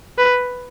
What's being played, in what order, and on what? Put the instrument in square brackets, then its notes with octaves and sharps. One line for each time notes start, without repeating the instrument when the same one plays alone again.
[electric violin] B4